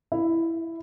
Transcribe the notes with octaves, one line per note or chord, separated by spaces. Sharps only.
E4